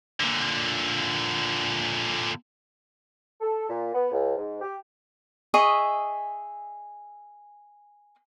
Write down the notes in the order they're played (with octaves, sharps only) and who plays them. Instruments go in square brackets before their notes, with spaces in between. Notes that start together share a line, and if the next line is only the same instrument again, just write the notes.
[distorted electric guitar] A#2 D3
[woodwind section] A4
A#2
B3
C#2
G#2
G4
[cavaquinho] G#4 D#5 E5 C#6